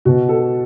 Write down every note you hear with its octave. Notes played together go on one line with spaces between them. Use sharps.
B2 F#4
A4